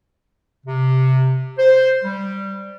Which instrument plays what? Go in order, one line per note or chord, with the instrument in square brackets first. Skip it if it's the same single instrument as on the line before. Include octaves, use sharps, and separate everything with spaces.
[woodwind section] C3
C5
G3